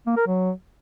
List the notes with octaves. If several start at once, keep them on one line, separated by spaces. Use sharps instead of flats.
A#3
A#4
F#3